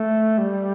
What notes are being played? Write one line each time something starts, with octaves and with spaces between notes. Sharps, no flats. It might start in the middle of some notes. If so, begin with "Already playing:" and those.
Already playing: A3
G3